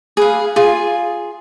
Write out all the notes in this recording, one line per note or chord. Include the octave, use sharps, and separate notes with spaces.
G#4 B4 F5
F4 G#4